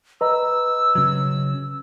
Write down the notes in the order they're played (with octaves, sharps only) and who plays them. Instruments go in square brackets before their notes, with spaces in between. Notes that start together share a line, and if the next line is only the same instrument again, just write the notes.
[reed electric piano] B4 D#5 A#5 [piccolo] E6
[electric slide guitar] C#3 F#3